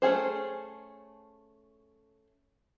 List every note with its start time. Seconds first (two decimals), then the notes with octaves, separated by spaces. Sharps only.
0.02 A3 C#4 F4 G#4 C5